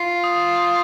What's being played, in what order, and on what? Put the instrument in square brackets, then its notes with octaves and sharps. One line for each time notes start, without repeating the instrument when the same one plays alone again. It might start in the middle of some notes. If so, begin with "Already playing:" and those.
Already playing: [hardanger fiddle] F4 [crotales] C7
[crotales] D#6